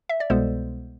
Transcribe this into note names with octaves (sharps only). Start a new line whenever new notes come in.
E5
D5
C2 B2 G#3 B3 A4 C5